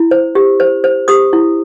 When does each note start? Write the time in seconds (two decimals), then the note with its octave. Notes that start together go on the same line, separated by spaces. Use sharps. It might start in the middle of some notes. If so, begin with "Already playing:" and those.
Already playing: E4
0.11 C5
0.35 G4
0.60 C5
0.84 C5
1.08 G4 D#6
1.33 E4